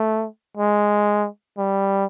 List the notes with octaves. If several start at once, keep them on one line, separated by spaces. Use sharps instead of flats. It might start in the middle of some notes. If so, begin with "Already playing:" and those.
Already playing: A3
G#3
G3